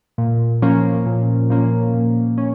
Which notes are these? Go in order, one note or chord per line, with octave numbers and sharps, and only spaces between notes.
A#2
F3 A#3 C#4
A#2
F3 A#3 C#4
A#2
C#4